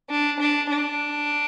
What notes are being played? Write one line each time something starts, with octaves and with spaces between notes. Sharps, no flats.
D4
D4
D4